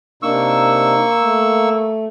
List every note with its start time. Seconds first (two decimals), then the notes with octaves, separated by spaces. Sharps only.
0.23 C3 A#3 D4 D#4 C#6 E6
1.22 A3